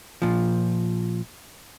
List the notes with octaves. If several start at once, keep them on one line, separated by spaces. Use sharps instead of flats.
A#2 F3